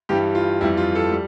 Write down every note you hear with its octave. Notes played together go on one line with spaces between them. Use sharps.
G2 E3 G3 G4
F4
F2 E3 G3 E4
F4
A4
G3